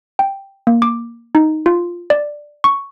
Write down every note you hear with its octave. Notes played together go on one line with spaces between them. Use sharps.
G5
A#3
D6
D#4
F4
D5
C#6